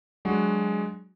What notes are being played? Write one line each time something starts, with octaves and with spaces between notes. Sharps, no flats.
F#3 G#3 D4 F#4